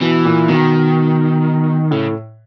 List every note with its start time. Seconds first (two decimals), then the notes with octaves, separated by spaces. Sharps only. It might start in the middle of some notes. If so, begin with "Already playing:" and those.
0.01 B2 E3
0.25 A#2
0.49 B2 D#3
1.91 A2 C#3